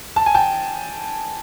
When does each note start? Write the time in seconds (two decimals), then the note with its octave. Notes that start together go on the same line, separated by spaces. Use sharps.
0.16 A5
0.26 G#5
0.34 G5 A5